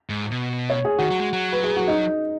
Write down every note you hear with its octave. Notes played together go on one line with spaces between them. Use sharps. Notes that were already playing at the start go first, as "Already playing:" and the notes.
G#2
B2
C#5
G#4
D#3 F#4
F#3
G#3
F#3
B4
G#4
F#4
D#4